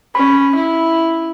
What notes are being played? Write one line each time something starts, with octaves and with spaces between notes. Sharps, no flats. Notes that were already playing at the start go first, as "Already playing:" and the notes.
C#4 B5
E4